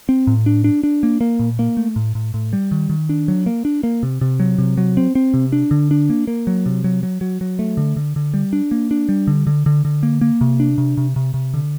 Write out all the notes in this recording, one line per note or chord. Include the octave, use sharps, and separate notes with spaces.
C4
A2
D4
D4
D4
A#3
A#3
A#2
A#3
A3
A2
A2
A2
G3
D#3
D#3
D4
F#3
A#3
D4
A#3
C3
C3
F#3
C3
F#3
C4
C4
C3
D4
D3
D4
A#3
A#3
F#3
C3
F#3
F#3
F#3
F#3
A3
D3
D3
D3
G3
D4
A#3
D4
G3
D3
D3
D3
D3
A#3
A#3
C3
D4
C3
C3
C3
C3
D3